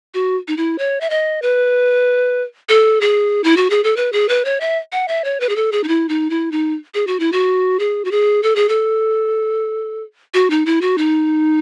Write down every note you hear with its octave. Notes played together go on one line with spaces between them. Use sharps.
F#4
D#4
E4
C#5
E5
D#5
B4
A4
G#4
E4
F#4
G#4
A4
B4
G#4
B4
C#5
E5
F#5
E5
C#5
B4
G#4
A4
G#4
D#4
E4
D#4
E4
D#4
G#4
F#4
E4
F#4
G#4
F#4
G#4
A4
G#4
A4
F#4
D#4
E4
F#4
D#4